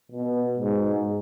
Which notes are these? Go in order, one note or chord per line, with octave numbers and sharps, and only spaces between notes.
B2
G#2